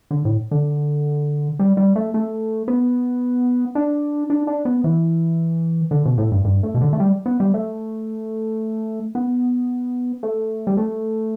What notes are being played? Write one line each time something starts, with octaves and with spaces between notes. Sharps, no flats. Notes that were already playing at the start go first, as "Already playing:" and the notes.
D3
A2
D3
G3
G3
A3
A3
B3
D4
D4
D4
B3
E3
D3
B2
A2
G2
G2
A2
B2
D3
A3
G3
B3
G3
A3
B3
A3
G3
A3